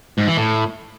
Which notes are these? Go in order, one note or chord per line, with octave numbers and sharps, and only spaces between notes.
G#2
E3
A2